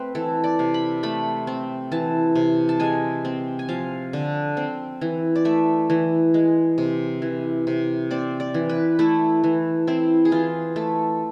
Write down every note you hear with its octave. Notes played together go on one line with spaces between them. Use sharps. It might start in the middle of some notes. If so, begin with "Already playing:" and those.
Already playing: A3 C4 B4
E3 A4
D5
C3
B5
A3 B5
C4
E3 A5
C3
A5
G#3 G#5
C4
G#5
F3 F5
D3
C4
E3
D5
A3 E5
E3
G#3
C3
E3
C3
C4 D5
D5
E3
B4
A3 E4
E3
C4 E4
G#4
E3 F4
A3 A4